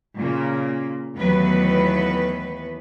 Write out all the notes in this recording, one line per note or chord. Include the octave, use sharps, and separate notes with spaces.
A#2 C#3 A#3
D#2 E3 F#3 A3 B3 B4